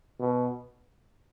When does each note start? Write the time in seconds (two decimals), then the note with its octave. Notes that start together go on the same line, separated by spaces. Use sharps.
0.19 B2